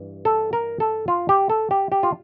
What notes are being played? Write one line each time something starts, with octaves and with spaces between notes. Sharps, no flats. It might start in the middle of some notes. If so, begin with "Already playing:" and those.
Already playing: G2 E3
A4
A#4
A4
F4
G4
A4
G4
G4
F4